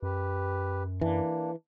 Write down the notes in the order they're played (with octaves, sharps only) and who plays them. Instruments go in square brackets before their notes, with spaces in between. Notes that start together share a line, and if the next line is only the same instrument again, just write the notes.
[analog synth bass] F#2 [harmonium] G4 B4
[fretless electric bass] E3 [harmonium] A#3 D4